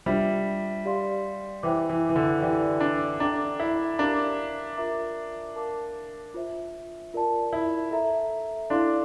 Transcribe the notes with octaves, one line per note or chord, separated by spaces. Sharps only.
G3 D4 F4 C5 E5
G4 D5 F5 C6
E3 C5 E5 G5 D6
E3
E3
D3
E3 G4 D5 G5
D4
D4 A4 E5 G5 A#5 D6
E4
D4 G4 A#4 F5 A#5 D6
F4 A#4 E5 A#5 D6
A#4 F5 A5 D6
F4 C5 E5
F4 A#4 D5 A5
E4
A4 E5 A#5
D4 E4 A4 D5 F5 C6